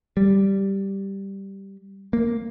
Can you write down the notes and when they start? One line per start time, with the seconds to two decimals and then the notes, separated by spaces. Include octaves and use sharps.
0.17 G3
2.13 A#3